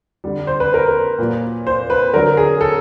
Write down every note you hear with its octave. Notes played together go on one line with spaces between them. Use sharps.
D3 G3
C5
B4
A#4
B4
A#2 F#3
C5
B4
D3 F#3 A#4
G#4
A4